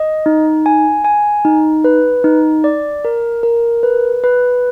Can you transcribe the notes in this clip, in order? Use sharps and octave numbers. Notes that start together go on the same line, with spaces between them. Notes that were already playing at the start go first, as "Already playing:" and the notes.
Already playing: D#5
D#4
G#5
G#5
D#4
B4
D#4
D5
A#4
A#4
B4
B4